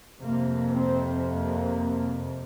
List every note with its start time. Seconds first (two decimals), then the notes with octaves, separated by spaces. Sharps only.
0.20 F2 C3 A#3
0.72 C4
1.25 A#3